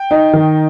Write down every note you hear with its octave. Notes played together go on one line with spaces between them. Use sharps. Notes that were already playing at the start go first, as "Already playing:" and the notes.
Already playing: G5
D#4
D#3